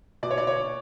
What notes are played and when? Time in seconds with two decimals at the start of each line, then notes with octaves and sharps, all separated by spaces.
0.23 B2 D5
0.31 C#5
0.38 D5
0.47 C#5